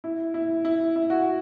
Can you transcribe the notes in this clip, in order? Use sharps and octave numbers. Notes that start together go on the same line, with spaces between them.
E4
E4
E4
E4
F#4